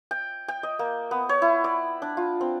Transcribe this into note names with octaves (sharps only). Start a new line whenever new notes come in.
G5
G5
D#5
A#3
B3
C#5
E4
D5
D4
F4
C4